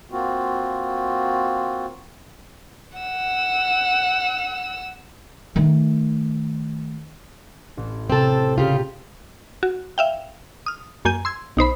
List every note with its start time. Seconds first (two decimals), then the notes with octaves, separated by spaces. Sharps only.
0.11 A#3 C4 F4 F#4
2.98 F#5 E6
5.56 D#3 A3
7.77 A1
8.10 C3 C4 A4 A5
8.58 C#3 F4 G4
9.63 F#4
9.98 E5 F5 G5
10.66 D#6 F6
11.05 F#2 A#3 G#5 G6 D#7
11.25 C6 E6 G#6
11.57 B1 D#4 C5 B5